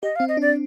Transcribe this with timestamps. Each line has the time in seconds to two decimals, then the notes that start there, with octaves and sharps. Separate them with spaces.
0.03 G4 D#5
0.16 F5
0.20 C4
0.28 D#5
0.37 D4
0.41 D5